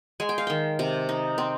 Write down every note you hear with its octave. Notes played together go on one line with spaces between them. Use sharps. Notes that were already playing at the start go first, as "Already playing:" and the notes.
G#3 G#5
G5
F5
D#3 G5
C3
D#4
C4